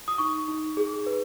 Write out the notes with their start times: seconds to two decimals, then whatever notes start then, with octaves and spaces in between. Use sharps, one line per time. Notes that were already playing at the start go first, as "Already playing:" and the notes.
0.08 D#6
0.18 D#4 C#6
0.48 D#4
0.77 G#4
1.07 B4